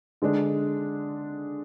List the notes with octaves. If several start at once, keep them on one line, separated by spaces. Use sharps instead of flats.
D3 G#3 D4